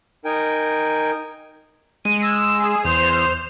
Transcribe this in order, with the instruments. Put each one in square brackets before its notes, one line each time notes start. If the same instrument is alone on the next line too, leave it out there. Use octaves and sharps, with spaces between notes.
[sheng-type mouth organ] D#4 A#4 G5 G#5
[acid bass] G#3 [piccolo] D#7
[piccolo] E6
[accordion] G#4
[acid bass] E2 [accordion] C5 [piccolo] F7